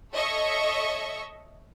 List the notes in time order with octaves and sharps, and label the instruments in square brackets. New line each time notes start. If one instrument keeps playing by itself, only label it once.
[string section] A4 C#5 D#5 E5 C#6